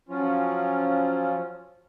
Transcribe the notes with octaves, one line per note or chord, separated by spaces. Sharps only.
F3 F#3 C#4 F4